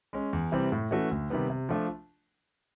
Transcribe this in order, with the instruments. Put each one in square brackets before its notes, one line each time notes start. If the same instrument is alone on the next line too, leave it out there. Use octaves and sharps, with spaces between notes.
[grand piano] G#3 C#4
E2
C3 E3 G3 C4
A2
E3 A3 C#4 F#4
D2
C3 D#3 G3 B3
C3
F3 A3 D4 F4